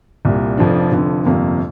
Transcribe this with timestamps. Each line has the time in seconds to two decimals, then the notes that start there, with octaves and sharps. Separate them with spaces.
0.25 C2 A#2 G3
0.57 F1 F2 F3 D4
0.92 F1 F2 D3
1.25 G1 F2 C3 A#3